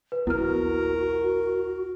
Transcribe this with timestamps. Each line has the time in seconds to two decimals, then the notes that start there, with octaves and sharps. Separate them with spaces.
0.12 B4
0.27 A#1 D#2 B3 E4 F#4 A#4 F6